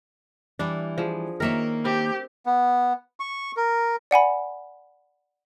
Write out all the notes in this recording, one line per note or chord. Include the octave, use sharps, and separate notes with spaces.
E3 G3 D4 E4
F3 G#4
D#3 A#3 A#4 C#5 E5
C4 G4
B3
C#6
A#4
D5 F#5 G#5 B5